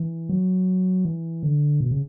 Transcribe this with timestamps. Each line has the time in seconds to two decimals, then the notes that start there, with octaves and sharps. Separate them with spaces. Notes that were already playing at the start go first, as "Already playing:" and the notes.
Already playing: E3
0.29 F#3
1.05 E3
1.43 D3
1.80 B2
1.91 C#3